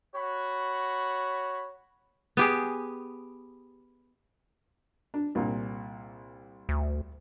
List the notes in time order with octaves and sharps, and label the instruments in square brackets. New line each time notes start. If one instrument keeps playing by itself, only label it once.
[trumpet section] F#4 B5 [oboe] C#5
[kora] B3 G4 G#4
[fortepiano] D4
C2 A#2
[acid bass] D2